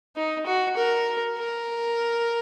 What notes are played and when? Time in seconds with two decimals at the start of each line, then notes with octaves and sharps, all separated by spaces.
0.16 D#4
0.46 F#4
0.77 A#4
1.38 A#4